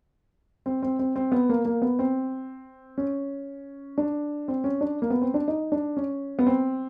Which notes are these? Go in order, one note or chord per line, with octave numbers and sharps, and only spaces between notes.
C4
C4
C4
C4
B3
A#3
A#3
B3
C4
C#4
D4
C4
C#4
D4
A#3
B3
C4
D4
D#4
D4
C#4
B3
C4